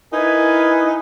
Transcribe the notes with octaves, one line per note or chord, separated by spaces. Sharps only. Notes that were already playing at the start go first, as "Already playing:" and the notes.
D#4 E4 A#4 B4 G#5